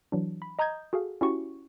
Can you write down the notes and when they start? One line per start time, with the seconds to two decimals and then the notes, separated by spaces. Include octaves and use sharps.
0.12 E3 F#3 D4
0.42 B5
0.59 D#5 A#5 D#6 G6 G#6
0.93 F#4 G#4 A4 F5
1.21 C#4 E4 F#4 G4 C#6